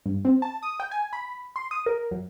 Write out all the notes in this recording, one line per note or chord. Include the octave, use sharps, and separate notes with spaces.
G2
C4
A5
D#6
G5
G#5
B5
C6
D#6
A#4
F#2